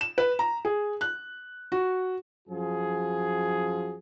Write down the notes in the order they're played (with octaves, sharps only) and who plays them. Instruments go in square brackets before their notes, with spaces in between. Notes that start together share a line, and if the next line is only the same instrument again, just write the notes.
[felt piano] E7
B4
A#5
G#4
F#6
F#4
[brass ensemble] F#2 F3 F#4 G#4